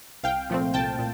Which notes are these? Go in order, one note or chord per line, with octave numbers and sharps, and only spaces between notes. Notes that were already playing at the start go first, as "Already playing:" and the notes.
C2 F5 G5
A#2 F3 A3 C4
C2 G5 A5
A#2